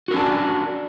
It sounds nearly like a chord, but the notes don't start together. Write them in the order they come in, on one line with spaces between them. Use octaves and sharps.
F#4 A#4 C#4 D4